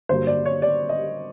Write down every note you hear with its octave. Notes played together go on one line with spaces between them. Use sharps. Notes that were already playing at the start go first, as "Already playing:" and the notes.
G2 D3 F#3 A#3 C5
D5
C#5
D5
D#5